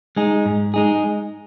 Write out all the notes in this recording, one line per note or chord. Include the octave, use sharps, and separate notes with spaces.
G#3 D#4 G#4
G#2
G#3 D#4 G#4